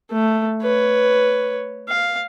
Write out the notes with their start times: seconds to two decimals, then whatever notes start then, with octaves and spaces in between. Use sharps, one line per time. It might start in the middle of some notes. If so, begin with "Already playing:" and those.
0.10 A3
0.62 B4 C#5
1.89 F5